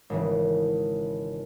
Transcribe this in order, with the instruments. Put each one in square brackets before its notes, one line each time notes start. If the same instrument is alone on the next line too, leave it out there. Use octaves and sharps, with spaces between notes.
[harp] G#1 C#3 E3